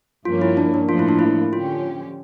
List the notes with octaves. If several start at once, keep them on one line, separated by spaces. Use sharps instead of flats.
G2 F3 A#3 C#4 F4
E4
D4
D4
A2 F3 A#3 F4
E4
D4
E4
D3 F3 C#4 F4 G4